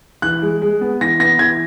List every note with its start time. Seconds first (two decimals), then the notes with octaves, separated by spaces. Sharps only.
0.22 E3 F#6
0.42 G#3
0.62 G#3
0.81 B3
1.01 E3 A#6
1.20 B3 A#6
1.39 E3 G#6